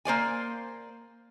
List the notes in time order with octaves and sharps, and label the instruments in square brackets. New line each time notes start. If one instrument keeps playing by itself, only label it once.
[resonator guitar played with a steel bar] A#3 C5 D5 G#5